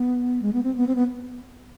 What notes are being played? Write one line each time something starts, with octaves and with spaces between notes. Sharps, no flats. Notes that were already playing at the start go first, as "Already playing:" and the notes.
Already playing: B3
G#3
B3
C4
B3
C4
B3